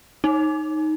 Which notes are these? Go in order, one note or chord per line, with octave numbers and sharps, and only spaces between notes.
D#4